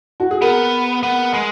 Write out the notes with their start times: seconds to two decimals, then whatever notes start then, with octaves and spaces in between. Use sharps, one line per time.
0.20 F#4
0.31 G#4
0.41 B3 A#4
1.03 B3
1.34 G#3